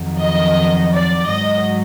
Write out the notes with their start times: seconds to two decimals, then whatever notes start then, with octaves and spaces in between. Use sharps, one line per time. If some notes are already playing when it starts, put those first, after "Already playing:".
Already playing: F2 D#3 F#3
0.21 D#5
0.93 D5
1.29 G#2 F#3 D#5